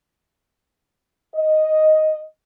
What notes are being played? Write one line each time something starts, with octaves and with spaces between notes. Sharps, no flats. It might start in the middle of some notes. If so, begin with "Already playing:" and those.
D#5